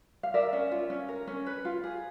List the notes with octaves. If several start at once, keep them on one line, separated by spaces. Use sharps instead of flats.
F5
A#4 D5 E5
C#4
F4
C#4
A#4
C#4
B4
F4
G#4